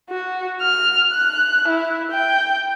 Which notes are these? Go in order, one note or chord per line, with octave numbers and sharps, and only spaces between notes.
F#4
F6
F#6
E4
G5